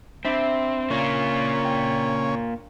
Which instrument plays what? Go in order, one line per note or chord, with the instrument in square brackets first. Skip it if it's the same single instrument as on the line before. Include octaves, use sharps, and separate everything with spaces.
[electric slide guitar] C4 [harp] D4 E5 B5
[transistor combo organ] C#3 C#4 [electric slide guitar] A#3 F4
[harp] G5